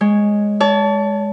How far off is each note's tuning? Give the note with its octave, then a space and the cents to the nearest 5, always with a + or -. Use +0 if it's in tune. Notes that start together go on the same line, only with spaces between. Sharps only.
G#3 +0 C#5 +0
C#5 +40 A5 +0